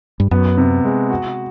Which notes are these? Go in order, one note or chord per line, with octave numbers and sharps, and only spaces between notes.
G2
F#2 B3
C3
G#3
F#4